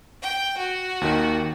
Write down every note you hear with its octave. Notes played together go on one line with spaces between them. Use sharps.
G5
F#4
D#2 D#3